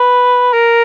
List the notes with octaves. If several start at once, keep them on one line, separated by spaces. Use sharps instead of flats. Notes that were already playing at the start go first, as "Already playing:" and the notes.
Already playing: B4
A#4